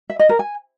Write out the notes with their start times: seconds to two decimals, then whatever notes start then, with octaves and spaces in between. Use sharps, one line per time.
0.10 E5
0.19 D#5
0.29 A#4
0.39 G#5